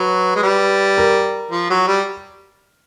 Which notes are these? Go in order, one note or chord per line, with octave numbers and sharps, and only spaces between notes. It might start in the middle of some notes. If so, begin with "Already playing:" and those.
Already playing: F#3 B4
G#3
G3
A#4
F3
F#3
G3